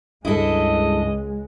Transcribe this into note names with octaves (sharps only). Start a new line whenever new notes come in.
C#2 G2 G#3 E4 A4 D#5